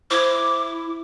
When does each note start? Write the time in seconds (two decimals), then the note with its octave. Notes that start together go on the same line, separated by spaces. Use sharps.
0.11 E4 C5 D6 G#6